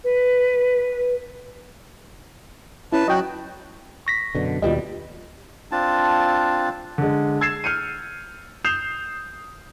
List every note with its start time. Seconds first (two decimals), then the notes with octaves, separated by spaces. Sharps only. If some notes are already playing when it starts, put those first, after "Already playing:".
0.04 B4
2.92 C#4 E4 B4 A5
3.08 F#3 F#4 D#5 G5 F#6
4.07 C#6 A#6 B6
4.35 F#2 B2 D3
4.62 D#2 B2 G3 F4 G4 D#5
5.72 C4 D4 F4 A5
6.98 D3 G#3
7.41 E6 G#6 A6 C7 E7
7.64 F6 G6 C#7 D#7
8.65 D#6 G6 C7 E7 F7